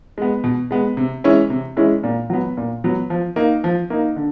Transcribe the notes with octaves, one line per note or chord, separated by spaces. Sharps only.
G#3 B3
B2
G#3 B3
C3
E3 G#3 C#4 E4
C3
E3 G#3 C#4 E4
A#2
F#3 B3
A#2
F#3 B3
F3
A#3 D#4
F3
A#3 D#4
D3